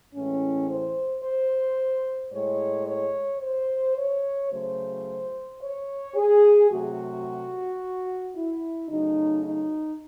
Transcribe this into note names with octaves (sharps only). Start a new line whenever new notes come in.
A2 E3 G#3 C#4
C5
C5
A2 G#3 C#5
C#5
C5
C#5
C#3 F#3 A3 C5
C#5
G#4
C3 F#3 A3 F#4
E4
C#3 F#3 A3 D#4
D#4